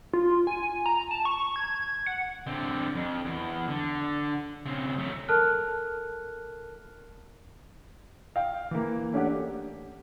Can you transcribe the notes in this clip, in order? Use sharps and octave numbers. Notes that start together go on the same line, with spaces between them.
F4
G#5
A#5
A5
C#6
G#6
F#5
D3 C4
F2
E2
D3
C#3 C4
F#3 A3
A4 A#4 A5 F6 F#6
F5 G5
E3 A#3
A3 C#4 D4 G4 F#5
G4